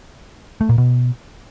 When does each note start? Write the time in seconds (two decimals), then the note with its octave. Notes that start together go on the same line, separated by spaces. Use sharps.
0.61 A3
0.69 A#2
0.78 B2